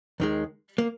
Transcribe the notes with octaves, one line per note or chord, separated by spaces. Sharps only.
D#2 D#3 G#3
A#3